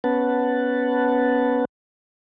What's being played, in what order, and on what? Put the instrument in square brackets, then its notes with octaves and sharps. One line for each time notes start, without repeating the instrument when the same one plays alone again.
[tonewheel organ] B3 C#4 B4 F#5 A5